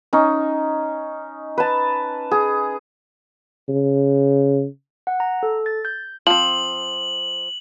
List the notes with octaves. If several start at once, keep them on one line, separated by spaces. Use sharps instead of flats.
C#4 D#4
B4 A5
G#4
C#3
F#5
A#5
A4
A6
G6
F3 C4 F#7